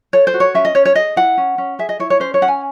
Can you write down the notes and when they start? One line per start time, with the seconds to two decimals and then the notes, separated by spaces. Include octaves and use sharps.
0.13 A4 C#5
0.27 C5
0.34 F#4
0.40 C#5
0.54 C#4 E5
0.65 D#5
0.75 C#4 C#5
0.85 C#5
0.95 G#4 D#5
1.16 E4 F#5
1.37 C#4
1.58 C#4
1.79 G#4 E5
1.89 D#5
1.99 E4 C#5
2.10 C#5
2.20 C#4 C5
2.34 C#5
2.42 C#4 F#5
2.48 G#5